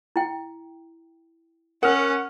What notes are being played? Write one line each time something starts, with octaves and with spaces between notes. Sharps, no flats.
E4 G5
C#4 A#4 F#5 F6